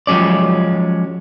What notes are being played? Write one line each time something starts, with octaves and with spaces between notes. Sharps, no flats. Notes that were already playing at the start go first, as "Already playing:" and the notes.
F3 F#3 G#3 C#4 D5